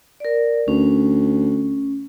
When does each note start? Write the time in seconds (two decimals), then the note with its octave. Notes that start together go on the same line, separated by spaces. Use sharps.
0.20 A#4 D5
0.68 D2 C#4